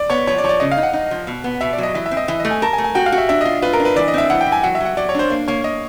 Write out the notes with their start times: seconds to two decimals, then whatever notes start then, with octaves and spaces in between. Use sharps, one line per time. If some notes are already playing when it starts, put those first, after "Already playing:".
Already playing: D5
0.10 B3 C#5
0.27 F3 C#5
0.38 D5
0.44 F3 C#5
0.49 D5
0.60 C#3 D#5
0.72 F5
0.77 D#4
0.83 F#5
0.93 D#4
1.11 F3
1.27 B2
1.44 B3
1.61 B2 E5
1.73 D5
1.78 F#3 D#5
1.95 E3 E5
2.06 E5
2.11 C4
2.17 D#5
2.28 E3 E5
2.40 A3 D#5
2.51 G#5
2.62 A#4 A5
2.73 G#5
2.78 A3
2.84 G#5
2.95 F#4 G5
3.06 F5
3.12 F#4
3.18 E5
3.29 D4 E5
3.41 F4 D#5
3.62 F4 B4
3.73 A#4
3.80 D4
3.85 B4
3.96 E3 D5
4.08 D#5
4.14 C4 E5
4.30 E3 F#5
4.41 G5
4.46 E3
4.52 G#5
4.63 F#3 F#5
4.75 E5
4.80 F#3 F#5
4.97 F#3 D5
5.09 C#5
5.15 D4 C5
5.30 A#3
5.48 A#3 C#5
5.64 A#3 D#5